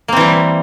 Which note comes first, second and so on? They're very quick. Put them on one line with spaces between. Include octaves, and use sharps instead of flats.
A#3 C4 E3 G3